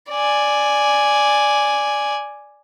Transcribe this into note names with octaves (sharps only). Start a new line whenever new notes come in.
D5 G#5